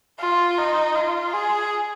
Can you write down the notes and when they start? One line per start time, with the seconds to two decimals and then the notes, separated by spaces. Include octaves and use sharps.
0.19 F4
0.58 D#4
0.95 F4
1.33 G#4